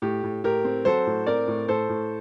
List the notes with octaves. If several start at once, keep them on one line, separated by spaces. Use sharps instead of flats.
A2 G4
A2
A2 G4 A#4
C4
F#3 A4 C5
A2
C4 A#4 D5
A2
A2 A4 C5
A2